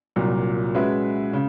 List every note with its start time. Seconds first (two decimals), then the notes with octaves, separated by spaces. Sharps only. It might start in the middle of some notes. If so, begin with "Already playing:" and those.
0.16 C2 A#2 F#3
0.75 G#3 C#4 F#4 B4 E5
1.33 C#3